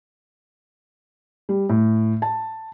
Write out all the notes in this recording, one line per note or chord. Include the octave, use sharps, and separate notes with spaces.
G3
A2
A5